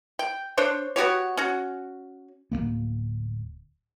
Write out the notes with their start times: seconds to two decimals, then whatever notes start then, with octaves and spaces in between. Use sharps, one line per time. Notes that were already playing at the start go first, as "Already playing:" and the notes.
0.19 G5
0.57 D4 C5 C#5
0.96 B3 F#4 G4 C#5
1.37 C#4 F#4
2.52 D1 G2 A#3 B3